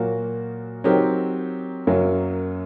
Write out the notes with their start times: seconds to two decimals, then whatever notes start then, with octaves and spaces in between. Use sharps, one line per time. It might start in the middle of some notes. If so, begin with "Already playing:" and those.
Already playing: A#2 F#3 A#3 F#4 A#4
0.84 F#3 C4 D#4 G4 A#4
1.87 F#2 F#3 A#3